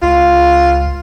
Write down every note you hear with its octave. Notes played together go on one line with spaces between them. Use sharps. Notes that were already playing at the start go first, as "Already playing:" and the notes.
C#2 F4